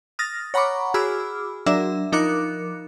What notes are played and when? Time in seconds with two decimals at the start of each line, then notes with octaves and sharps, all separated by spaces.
0.19 D#6 F6 A6 A#6
0.54 C#5 F#5 A#5 B5 C#6 D6
0.94 F#4 G#4 B5 D6 E6 F6
1.66 F#3 D4 A#4 E5 E6
2.12 F3 D#4 A#4 D6 F#6 C#7